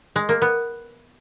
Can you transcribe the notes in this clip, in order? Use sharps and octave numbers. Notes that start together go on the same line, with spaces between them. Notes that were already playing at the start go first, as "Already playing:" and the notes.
G#3
A#3
B3